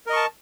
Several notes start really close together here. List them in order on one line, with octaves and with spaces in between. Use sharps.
A#4 D#5 C#6 A5